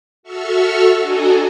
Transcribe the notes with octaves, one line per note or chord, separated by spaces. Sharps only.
F#4 A4 E5 C#6 E6 F6
D4 F#4 A4 D#5 G#5 A#5